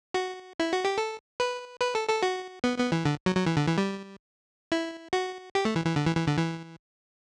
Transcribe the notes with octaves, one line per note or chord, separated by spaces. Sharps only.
F#4
E4
F#4
G4
A4
B4
B4
A4
A4
F#4
B3
B3
E3
D3
F#3
F#3
E3
D3
E3
G3
E4
F#4
G4
A3
E3
E3
D3
E3
E3
D3
E3